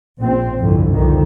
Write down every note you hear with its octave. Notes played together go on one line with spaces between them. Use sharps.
A#1 C4
G1 C2 F2 D3
C2 F2 D3 D#3